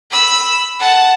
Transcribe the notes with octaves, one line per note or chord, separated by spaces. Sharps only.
B5 E6
F#5 A5